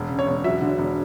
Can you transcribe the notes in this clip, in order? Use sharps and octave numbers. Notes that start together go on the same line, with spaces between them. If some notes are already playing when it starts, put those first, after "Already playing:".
Already playing: E1
C#3
C#5
E1
F#3 E5
D3
E1